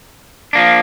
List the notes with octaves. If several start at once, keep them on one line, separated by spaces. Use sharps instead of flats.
F3 A#3 D4